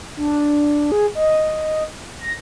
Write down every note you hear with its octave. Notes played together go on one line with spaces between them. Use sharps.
D4
G#4
D#5
A#6